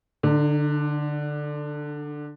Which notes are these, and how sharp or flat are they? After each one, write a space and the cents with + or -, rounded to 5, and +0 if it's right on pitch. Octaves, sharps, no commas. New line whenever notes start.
D3 +10 D#4 -35